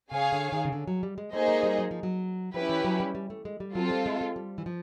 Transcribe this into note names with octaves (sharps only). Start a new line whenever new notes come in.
C#3 G#4 C#5 F5 G#5
D3
D#3
C#3
D3
F#3
G3
G#3
A3 A#3 D#4 G#4 C5 D#5
G#3
G3
F#3
F3
F#3
F3 C#4 E4 G4 B4
E3
F#3
G3
G3
A3
G#3
G3
F#3 C4 F4 A4
G3
G#3
G#3
G3
E3
F3